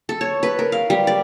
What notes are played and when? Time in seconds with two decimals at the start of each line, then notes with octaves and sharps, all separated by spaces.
0.09 A4
0.21 C#5
0.43 B4
0.59 A#4
0.72 F5
0.90 G3
1.07 D5